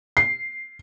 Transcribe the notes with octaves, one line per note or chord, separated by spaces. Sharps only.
C7